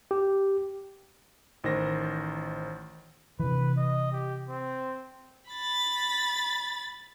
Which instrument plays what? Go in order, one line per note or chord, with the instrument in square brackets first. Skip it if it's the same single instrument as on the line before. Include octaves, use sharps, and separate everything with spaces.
[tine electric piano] G4
[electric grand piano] A1 D#3 C5 A#6
[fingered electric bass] C3 E3 [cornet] B4
[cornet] D#5
G4
C4
[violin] B5 A6